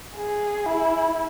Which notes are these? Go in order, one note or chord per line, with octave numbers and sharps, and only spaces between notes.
G#4
E4